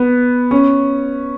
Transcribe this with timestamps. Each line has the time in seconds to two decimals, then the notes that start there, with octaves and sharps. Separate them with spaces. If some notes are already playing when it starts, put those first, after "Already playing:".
Already playing: B3
0.51 C#4